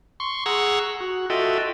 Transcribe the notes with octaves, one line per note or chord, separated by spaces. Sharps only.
C6 C#6
G#4 F#5 A#5 C#6 E6
F#4
F4 F#4 A4 D#5 E5 G5